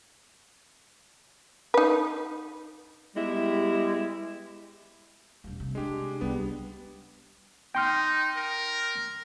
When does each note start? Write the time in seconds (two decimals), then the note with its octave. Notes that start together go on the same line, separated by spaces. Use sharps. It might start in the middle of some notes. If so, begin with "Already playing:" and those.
1.74 D#4 B4
3.16 G3 G#3 B3 E4 G4
5.44 E1 G3
5.60 C3
5.75 G#3 D4 G4
6.21 C#2 G3 B3
7.75 D#4 G5 C6 F6
8.36 A#4